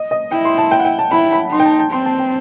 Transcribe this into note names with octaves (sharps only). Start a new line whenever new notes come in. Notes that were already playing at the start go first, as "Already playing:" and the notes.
Already playing: D#5
D#5
E4 G5
C6
A5
G5
F#5
G5
A5
E4 B5
B5
D#4 C6
G5
A5
A5
C4 C6
A5
G5